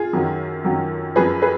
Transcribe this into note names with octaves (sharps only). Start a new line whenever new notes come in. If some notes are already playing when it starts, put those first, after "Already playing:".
Already playing: F4 G#4
F#2 D#3 F#3
F#2 D#3 F#3
F#2 F3 G#4 B4
G#4 B4